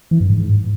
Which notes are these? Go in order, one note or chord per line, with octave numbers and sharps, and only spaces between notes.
E3
G2
G#2